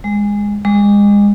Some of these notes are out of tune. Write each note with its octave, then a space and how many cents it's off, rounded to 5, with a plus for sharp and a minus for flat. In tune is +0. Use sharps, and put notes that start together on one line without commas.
G#3 -15
G#3 -30